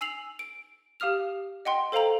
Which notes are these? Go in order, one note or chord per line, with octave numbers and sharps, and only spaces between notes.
G#5 E6 C7 F7 F#7
D7
G4 F5 D#6 F6 F7
D#5 F#5 G5 C6
A4 C5 F5 G5 A#5 F#7